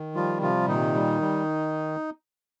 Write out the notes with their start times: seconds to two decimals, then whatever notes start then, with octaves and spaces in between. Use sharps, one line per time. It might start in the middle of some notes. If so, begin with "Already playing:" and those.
Already playing: D#3
0.15 F3 G3 F4
0.41 C3 F3 F4
0.67 A#2 D#3 D#4
0.94 G3
1.21 G3